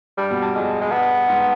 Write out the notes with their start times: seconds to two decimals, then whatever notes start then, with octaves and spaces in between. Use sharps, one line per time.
0.17 G2 G3
0.31 B2
0.42 G2
0.55 F2 G#3
0.81 G#3
0.91 G2 B3
1.29 G#2